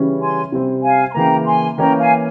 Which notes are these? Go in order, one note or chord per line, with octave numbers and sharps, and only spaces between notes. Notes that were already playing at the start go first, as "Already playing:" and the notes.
Already playing: C#3 E3 G3 C#4
G#5 C6
C3 G3 C4
F5 G#5
C6
C#3 E3 A#3 G5 A#5
G#5 C6
E3 A#3 C#4 G5 A#5
F5 G#5